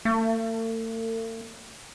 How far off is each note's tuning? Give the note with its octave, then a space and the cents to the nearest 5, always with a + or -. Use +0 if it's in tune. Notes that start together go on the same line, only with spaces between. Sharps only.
A3 +45